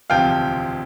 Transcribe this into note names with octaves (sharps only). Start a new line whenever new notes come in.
E1 D2 C3 F3 F5 G5